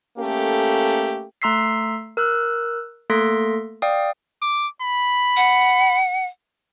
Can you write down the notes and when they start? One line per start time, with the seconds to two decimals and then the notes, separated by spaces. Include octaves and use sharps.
0.18 A3 A#3 C#4 G4 A4
1.42 A3 A#5 C6 E6 B6 C7
2.17 A#4 E6 F#6
3.10 A3 A#3 A4 C6 A#6 B6
3.82 D5 F5 G5 D#6
4.42 D6
4.82 B5
5.37 F#5